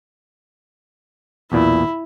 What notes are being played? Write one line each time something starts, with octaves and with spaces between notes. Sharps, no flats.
B1 E2 A#2 E4